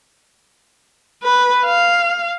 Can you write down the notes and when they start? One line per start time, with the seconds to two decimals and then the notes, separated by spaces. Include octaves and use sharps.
1.23 B4
1.66 F5